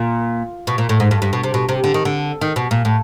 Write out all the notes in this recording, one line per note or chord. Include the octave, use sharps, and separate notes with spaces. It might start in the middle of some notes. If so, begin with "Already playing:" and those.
Already playing: A#2
B2
A#2
A2
G#2
G2
G2
B2
C3
B2
C3
D3
D#3
D3
D#3
B2
A#2
A2